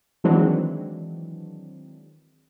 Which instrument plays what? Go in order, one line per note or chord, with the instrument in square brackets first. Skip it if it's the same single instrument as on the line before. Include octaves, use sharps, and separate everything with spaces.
[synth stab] D#3 E3 F#3 G#3 C4 D4